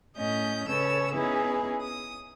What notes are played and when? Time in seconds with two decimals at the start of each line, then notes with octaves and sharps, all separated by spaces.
0.17 A2 A3 C#4 D#5 G6
0.67 C#3 C#4 A4 B4 C#5 E6
1.13 B3 C#4 D#4 E4 G#4 B4
1.81 D#6